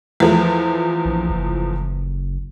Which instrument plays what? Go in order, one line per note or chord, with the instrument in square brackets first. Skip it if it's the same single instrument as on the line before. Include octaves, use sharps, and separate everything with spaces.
[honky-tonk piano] E2 F3 A3
[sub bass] A#1
F#1